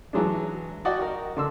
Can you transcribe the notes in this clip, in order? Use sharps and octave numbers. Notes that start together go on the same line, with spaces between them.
E3 F#3 G#3 D4
F#4 D5 D#5 F#5 G5
F#4 A#4
D3 C6 E6